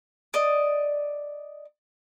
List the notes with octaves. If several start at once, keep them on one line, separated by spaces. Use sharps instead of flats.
D5 D#5